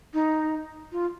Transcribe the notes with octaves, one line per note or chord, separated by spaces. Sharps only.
D#4
F4